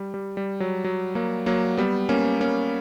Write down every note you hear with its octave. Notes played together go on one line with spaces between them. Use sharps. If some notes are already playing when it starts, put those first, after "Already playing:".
Already playing: G3
G3
G3
F#3
F#3
F#3 A#3
F#3 A#3
G3 B3
A#3 C#4
A#3 C#4